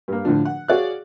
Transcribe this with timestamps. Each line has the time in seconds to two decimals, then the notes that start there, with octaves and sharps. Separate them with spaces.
0.08 G2 A#3
0.25 A2 D3 F3 D4
0.45 F#5
0.68 F#4 G#4 C#5 D5 F5 F#6